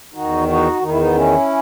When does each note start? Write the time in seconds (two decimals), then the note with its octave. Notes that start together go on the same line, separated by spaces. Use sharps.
0.14 E2 D#3 D#4 F#4
0.48 D#4 F#4
0.81 E2 D#3 D#4
0.90 E4
0.97 B3 D#4
1.15 C#4 E4